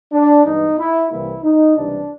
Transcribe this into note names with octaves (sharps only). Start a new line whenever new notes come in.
D4
G2 E3 G#3 B3 D#4
E4
C2 C3 E3 G3 A#3 E4
D#4
C#2 C3 E3 G3 D4